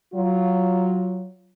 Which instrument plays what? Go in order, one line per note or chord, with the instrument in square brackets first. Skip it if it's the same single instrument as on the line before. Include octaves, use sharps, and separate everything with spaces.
[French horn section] F#3 F4